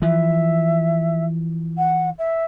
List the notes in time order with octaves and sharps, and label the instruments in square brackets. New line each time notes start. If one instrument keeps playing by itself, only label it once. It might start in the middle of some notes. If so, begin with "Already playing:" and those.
[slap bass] E3 F3 [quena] E5
[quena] F#5
E5